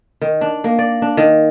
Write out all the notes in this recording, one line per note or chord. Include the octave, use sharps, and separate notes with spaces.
D#3
D4
A#3
D5
D4
D#3